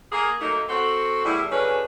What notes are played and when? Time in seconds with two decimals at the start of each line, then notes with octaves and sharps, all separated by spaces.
0.12 A#3 G#4
0.41 F#3 A3 A#3 D#4
0.69 C4 F#4 A4
1.25 E2 A2 G3 E4
1.51 F#2 C#3 C#4 D4 A4 B4